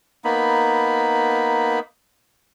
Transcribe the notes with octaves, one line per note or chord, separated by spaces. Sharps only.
A#3 B3 D#4 B5